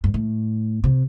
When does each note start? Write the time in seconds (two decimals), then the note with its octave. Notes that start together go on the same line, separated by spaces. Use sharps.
0.04 G2
0.14 A2
0.84 C3